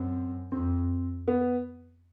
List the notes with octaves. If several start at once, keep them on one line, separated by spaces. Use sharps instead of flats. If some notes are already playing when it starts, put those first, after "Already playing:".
Already playing: F#2 C4
F2 C4
B3